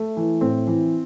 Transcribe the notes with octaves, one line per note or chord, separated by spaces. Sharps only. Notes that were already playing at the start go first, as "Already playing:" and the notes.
Already playing: A3
E3
A2 C4
E3